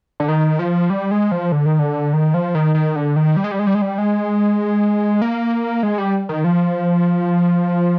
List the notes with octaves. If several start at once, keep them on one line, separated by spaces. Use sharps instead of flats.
D3
D#3
F3
G3
G#3
F3
D3
D#3
D3
D#3
F3
D#3
D#3
D3
D#3
G3
G#3
G3
G#3
G3
G#3
G3
G#3
A#3
G#3
G3
D#3
F3